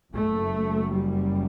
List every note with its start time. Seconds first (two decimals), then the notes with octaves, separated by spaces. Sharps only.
0.13 F#1 F#2 A3
0.93 G3